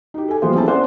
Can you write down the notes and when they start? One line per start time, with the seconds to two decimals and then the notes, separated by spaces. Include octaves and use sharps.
0.14 D#4 G4
0.28 A4 G#5
0.42 F3 G3 A#3 B3 G#4 C5
0.55 C4 C#4 E4 G4 A4 A5
0.67 B3 C#4 C5 D5 F#5